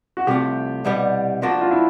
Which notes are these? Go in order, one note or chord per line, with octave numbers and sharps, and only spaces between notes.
F#4
C2 C3 F3 A3 G4
C2 B2 G3 B3
F3 A#3 D4 F#4
F4
E4